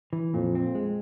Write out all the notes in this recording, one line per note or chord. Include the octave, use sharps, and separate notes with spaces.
E3
F2 A#2
C4
G#3